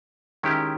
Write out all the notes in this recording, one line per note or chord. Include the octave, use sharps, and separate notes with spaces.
D#3 G#3 C#4 E4 G4